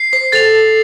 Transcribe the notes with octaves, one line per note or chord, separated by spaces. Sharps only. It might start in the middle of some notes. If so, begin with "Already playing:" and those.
Already playing: C7
C5
A4 A6 F7